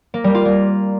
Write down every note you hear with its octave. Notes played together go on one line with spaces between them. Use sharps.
A#3
G3
F4
A#3